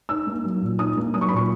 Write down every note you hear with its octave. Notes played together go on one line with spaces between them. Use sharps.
D#4 E6
A#3
F#3
A#2
D#4 D#6
A#3
F#3 D#6
C#6
B5
A#2 C#6